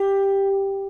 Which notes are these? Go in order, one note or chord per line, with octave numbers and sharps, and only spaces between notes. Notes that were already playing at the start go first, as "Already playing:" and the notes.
Already playing: G4